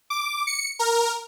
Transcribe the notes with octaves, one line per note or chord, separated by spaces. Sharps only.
D6
C#7
A#4